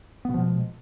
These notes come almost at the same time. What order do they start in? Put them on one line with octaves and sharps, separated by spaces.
B3 B2 F3 G#3